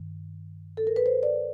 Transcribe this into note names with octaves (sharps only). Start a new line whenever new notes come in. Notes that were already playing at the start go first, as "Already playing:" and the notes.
Already playing: G2 D#3
A4
A#4
B4
C5
D5